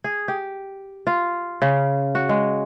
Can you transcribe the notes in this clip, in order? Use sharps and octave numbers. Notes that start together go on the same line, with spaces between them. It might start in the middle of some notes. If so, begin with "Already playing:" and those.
G#4
G4
F4
C#3
F#4
G#3